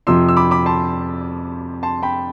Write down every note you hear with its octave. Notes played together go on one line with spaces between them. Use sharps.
F2 C3 F3 C6 E6
E6
B5 D6
B5 D6
A5 C6
A5 C6
G5 B5